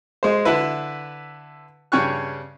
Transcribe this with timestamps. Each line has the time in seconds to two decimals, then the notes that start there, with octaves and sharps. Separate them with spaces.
0.23 G#3 C5
0.45 D3 E4 B4
1.92 G2 C#3 C#4 G5 C#6 F#6